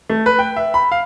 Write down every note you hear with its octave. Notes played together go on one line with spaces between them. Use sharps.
A3
B4
G5
E5
B5
F5